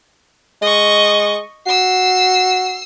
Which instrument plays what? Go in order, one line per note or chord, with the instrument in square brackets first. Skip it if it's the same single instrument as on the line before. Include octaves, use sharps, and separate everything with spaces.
[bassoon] G#3 [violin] D#5 C#6
[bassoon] F#4 [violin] E6 C7